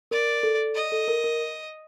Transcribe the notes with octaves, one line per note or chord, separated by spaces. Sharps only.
A#4 D5
A4
D#5
A4
A#4
A#4